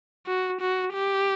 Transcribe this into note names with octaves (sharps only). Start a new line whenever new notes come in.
F#4
F#4
G4